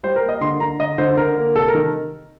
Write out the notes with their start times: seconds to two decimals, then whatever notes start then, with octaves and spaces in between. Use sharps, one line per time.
0.03 G3 C5
0.16 A#4
0.22 A#3
0.29 D#5
0.41 D3 C6
0.60 D3 A#5
0.79 D3 D#5
0.98 D3 C5
1.17 D3 A#4
1.37 A#3
1.55 C3 A4
1.68 A#4
1.75 D#3